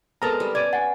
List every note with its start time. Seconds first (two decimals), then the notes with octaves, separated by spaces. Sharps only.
0.22 G#3 B3 C4 A4 A#4 A5 A#5 F6
0.40 G3
0.55 C#4 D5 G#6 D#7
0.73 F#5 G#5 A6